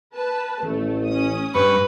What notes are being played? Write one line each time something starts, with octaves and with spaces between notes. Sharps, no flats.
B4 A5
A1 A3
C#4 D#6
G2 B4 C#6